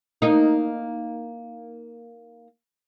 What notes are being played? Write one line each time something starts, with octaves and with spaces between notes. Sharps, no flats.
A#3 D#4